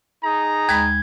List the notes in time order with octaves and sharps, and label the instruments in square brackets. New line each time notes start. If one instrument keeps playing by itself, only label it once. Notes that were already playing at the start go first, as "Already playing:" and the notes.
[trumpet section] D#4 G#4 A#5
[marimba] D#2 G#3 B5 [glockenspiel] G#6